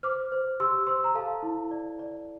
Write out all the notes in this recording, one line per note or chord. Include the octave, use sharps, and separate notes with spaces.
C5 D6 F6
C5
G4 C6 E6
C5 C6 E6
A#5
A4 F5 A5
E4
D5
D5